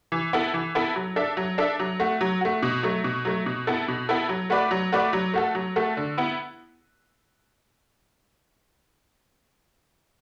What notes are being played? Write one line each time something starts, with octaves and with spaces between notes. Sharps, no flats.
E3
B3 E4 A4
E3
B3 E4 A4
F#3
D4 A4 E5
F#3
D4 A4 E5
F#3
A3 F#4
F#3
A3 F#4
B2
F#3 A3
B2
F#3 A3
B2
B3 E4 A4
B2
B3 E4 A4
F#3
A3 F#4 B4 D5
F#3
A3 F#4 B4 D5
F#3
A3 F#4 A4
F#3
A3 F#4 A4
D3
B3 E4